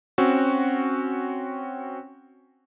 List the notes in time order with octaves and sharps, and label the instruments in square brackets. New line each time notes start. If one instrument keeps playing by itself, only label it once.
[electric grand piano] C4 C#4 F#4